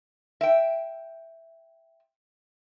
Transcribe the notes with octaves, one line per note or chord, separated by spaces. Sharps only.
E5 G5